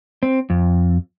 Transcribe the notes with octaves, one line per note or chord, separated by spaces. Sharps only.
C4
F2